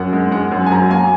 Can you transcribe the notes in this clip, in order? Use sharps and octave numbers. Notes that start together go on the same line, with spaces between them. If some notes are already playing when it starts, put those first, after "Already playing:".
Already playing: F#2 F#5
G#3
G#3 F#5
F#2
G#5
F#3 A#5
A#3 G#5